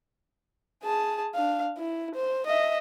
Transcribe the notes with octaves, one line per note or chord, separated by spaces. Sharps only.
G#4 A5
D4 F5
E4
C5
D#5 E5